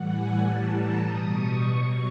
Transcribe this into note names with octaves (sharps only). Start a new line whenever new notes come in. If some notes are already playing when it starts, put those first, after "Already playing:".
Already playing: A2 E3 G3 F#5
G#5
A2 E3 G3 A5
A#5
B2 G3 D#6
C#6
B2 F#3